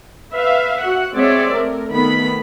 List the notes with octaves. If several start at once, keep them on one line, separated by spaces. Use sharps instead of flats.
B4 E5 F5
F#4 F#5
G#3 C4 C#5 D5 E5
A3 A#4
D#3 A3 B3 B5